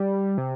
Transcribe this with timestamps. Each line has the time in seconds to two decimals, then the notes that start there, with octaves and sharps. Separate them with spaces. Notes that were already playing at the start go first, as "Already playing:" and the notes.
Already playing: G3
0.38 C3